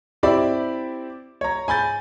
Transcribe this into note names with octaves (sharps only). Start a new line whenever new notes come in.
C4 E4 G4 D5 E5 B5
C#5 A#5
G#5 B5 G6 A6